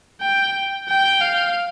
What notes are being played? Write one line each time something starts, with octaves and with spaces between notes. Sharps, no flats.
G5
G5
F5